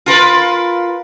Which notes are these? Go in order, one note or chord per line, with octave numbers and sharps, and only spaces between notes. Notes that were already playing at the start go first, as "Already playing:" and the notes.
F4 A#4 B4